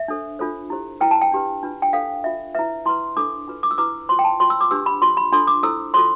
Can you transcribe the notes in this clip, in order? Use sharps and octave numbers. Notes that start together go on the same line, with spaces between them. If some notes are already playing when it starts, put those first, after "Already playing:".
Already playing: E5
D4 A4 C5
D4 F4 A4 C5
E4 G4 C5
E4 B4 G5
A5
G5
D4 G4 B4
D4 F4 B4
G5
D4 A4 C5 F5
D4 F4 C5 E5
E4 B4 E5
E4 B4 C6
D4 A4 C5 D6
D4 F4 B4
D6
E6
E4 B4 D6
F4 C5 C6
G5
A5
F4 C5 C6
E6
D6
D4 G4 B4 E6
B5
F4 C5 C6
B5
D4 F4 A4 C5 C6
D6
E4 A4 C5 E6
F4 A4 C5 C6